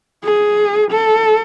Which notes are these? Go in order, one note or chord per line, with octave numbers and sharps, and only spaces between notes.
G#4
A4